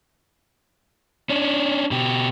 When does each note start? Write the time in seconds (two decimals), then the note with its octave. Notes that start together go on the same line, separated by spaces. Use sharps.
1.30 C#4 D4
1.91 B2 G4